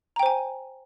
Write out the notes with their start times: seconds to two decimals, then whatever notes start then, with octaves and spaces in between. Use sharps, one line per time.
0.16 A#5
0.19 G5
0.23 C5
0.26 G#5